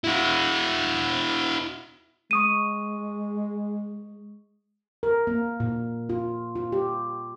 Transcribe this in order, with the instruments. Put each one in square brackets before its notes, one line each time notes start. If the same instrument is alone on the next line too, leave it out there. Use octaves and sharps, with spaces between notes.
[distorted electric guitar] E4 F#4
[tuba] G#3 [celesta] C#6 D#6 D#7
[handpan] A#4
A#3
A#2
F4
F4
G4